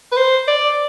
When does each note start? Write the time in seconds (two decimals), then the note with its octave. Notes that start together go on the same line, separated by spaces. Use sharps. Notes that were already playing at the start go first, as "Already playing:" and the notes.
0.12 B4
0.17 C5
0.48 D5